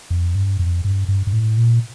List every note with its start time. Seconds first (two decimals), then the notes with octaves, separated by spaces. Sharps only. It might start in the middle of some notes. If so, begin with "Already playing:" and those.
0.10 F2
0.35 G2
0.59 F2
0.84 G2
1.08 G2
1.27 G2
1.33 A2
1.57 A#2